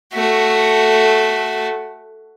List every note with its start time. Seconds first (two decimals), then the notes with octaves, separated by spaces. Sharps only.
0.14 A3 F#4